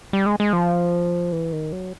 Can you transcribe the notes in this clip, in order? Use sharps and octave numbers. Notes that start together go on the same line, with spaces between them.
G3
G#3
G#3
F3
E3
D#3
F#3